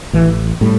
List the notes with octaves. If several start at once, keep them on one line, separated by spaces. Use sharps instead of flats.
A1 E3
A2 G3